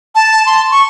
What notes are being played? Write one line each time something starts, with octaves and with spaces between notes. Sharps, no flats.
A5
C6
C#6